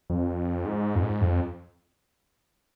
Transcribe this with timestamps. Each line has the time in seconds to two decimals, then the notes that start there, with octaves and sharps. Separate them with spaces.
0.10 F2
0.65 G#2
0.95 F2
1.03 G#2
1.21 F2